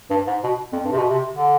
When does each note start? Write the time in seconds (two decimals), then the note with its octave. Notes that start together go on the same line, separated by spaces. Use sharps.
0.10 G2
0.27 G#2
0.43 B2
0.72 F2
0.85 G2
0.91 C3
0.98 B2
1.10 C3
1.35 D3